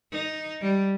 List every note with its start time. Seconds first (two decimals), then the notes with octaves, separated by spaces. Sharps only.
0.12 D#4
0.61 G3